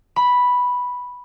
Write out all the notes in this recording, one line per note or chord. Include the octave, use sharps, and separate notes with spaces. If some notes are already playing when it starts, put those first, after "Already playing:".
B5